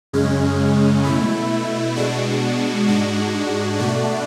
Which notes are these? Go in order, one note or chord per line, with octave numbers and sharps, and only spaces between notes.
F#2 C#3 G#3 C#4
B2 A3 E4
B2 G#3 D4 F#4
G#2 G#3 D4 F#4
B2 A3 D4 F#4